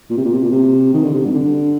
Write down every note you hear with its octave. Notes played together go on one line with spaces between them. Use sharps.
A#2
C3
A#2
C3
A#2
C3
D#3
D3
C3
G2
D3